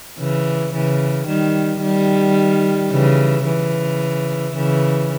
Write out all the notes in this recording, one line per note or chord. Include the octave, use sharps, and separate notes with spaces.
C#3 E3
C#3 E3
D#3 G3
D#3 G3
C#3 E3
C#3 E3
C#3 E3